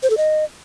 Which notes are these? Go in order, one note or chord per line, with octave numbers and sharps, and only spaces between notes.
C5
A4
D#5